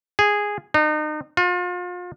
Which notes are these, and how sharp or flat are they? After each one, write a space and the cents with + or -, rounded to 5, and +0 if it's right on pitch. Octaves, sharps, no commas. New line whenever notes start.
G#4 -10
D#4 -35
F4 +35